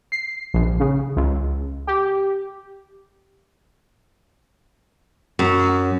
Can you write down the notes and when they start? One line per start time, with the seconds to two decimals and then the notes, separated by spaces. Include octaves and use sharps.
0.12 C7
0.54 A#1
0.80 C#3
1.16 C#2
1.87 G4
5.39 F#2